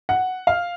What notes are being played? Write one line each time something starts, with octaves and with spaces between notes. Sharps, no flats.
F#5
F5